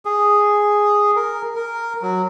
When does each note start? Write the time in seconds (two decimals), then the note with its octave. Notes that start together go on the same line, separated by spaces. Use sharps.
0.05 G#4
1.16 A#4
1.56 A#4
2.02 F#3